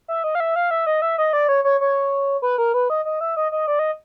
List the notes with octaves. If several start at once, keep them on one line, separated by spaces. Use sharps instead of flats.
E5
D#5
F5
E5
F5
E5
D#5
E5
D#5
D5
C#5
C#5
C#5
B4
A#4
B4
D#5
D#5
E5
D#5
D#5
D5
D#5